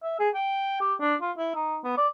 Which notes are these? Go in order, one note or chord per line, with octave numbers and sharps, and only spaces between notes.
E5
G#4
G5
G4
D4
F4
E4
D#4
B3
D5